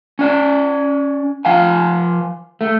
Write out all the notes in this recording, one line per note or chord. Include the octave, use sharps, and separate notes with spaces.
C#4 D5
F3 F5 G#5
A3